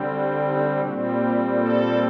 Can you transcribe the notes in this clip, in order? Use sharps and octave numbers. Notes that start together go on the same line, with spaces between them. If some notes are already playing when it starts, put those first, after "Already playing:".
Already playing: D3 G3 C4
F#4
D#4
A#2 G3 C4 F#4
G4
A4